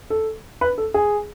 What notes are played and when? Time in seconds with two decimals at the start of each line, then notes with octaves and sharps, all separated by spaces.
0.10 A4
0.61 B4
0.78 A4
0.94 G#4